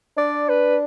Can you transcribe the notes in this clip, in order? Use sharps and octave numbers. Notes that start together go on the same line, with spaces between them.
D4 D5
B4